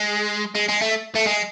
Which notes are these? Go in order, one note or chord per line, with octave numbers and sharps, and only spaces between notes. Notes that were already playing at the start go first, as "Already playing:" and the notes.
Already playing: G#3
G#3
G#3
A3
A3
G#3